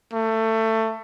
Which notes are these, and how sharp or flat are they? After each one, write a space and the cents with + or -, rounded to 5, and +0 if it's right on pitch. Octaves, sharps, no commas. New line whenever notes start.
A3 +20